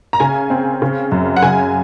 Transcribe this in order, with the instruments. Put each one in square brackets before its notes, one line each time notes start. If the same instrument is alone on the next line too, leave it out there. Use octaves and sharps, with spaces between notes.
[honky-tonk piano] A#5
C#3 G#5
C4
C#3
F#2
F#5
C#3 G#5